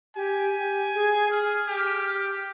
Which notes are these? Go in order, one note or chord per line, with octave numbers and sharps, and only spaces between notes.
G4 G#5
G4
G#4
G#4 F6
G4